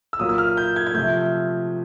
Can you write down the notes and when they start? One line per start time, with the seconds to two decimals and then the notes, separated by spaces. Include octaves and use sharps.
0.13 E6
0.19 A#2 F#3 A#3 D#6
0.29 E6
0.38 F6
0.57 G6
0.76 G#6
0.87 G#6
0.94 C3 F3 A3 G6